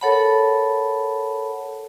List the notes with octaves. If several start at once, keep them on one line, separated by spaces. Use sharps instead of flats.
A4 A#4 C#5 F#5 A5 B5